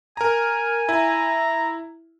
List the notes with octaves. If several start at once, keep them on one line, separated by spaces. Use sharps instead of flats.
A#4 G#5 A#5
E4 A#5